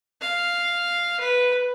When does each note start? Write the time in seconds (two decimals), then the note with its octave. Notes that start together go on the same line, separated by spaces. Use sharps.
0.21 F5
1.20 B4